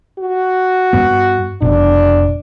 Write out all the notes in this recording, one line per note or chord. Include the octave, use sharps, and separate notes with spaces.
F#4
G2 B3
F1 B2 D4